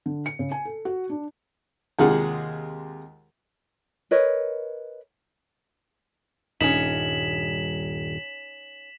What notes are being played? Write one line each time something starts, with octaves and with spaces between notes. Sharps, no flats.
D3
C#7
C#3
G#5
A4
F#4
D4
D#2 C3 G#3 F4 G#4 F#5
A#4 B4 C#5 D#5
D#1 G2 C#4 D#4 B6 E7 F#7